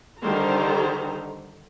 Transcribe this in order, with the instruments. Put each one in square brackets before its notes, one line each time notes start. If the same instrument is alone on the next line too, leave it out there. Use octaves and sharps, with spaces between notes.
[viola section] D3 D#3 G3 C5 A#5